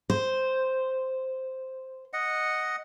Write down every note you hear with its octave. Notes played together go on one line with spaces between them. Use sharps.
C5
D#5 F#5